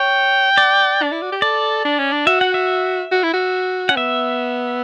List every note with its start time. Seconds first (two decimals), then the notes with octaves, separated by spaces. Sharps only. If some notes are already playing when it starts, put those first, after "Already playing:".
Already playing: C#5 G5
0.58 D5
1.03 D4
1.12 E4
1.22 F#4
1.32 G4
1.42 A4 D5
1.85 D4
1.99 C#4
2.12 D4
2.27 F#4 E5
2.41 F#5
2.54 E5
3.12 F#4
3.24 E4
3.34 F#4
3.89 C#4 F#5
3.96 B3 E5